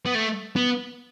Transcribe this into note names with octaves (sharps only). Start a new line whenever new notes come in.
B3
A3
B3